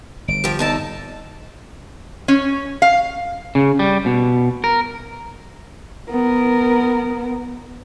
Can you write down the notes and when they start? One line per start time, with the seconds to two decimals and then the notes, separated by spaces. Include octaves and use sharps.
0.28 G1 D7
0.44 F3 G4
0.59 E2 D#4 A4 A5
2.28 C#4
2.82 F5
3.55 C#3
3.79 G3
4.06 B2
4.64 A#4
6.10 B3 A#4